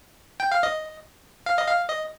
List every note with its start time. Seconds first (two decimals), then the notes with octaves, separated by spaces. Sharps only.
0.40 G5
0.51 F5
0.63 D#5
1.46 F5
1.58 D#5
1.67 F5
1.88 D#5